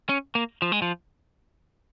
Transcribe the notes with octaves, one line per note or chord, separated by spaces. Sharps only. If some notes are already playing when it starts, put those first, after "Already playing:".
C#4
A#3
F3
G#3
F3